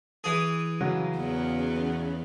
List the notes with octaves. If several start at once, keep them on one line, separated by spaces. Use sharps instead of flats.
E3 G#4
C#3 F#3
E2 B3